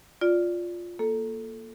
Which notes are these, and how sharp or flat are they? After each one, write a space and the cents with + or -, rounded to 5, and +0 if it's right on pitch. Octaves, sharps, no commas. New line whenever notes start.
F4 +5 D5 -5
A#3 +0 A4 +0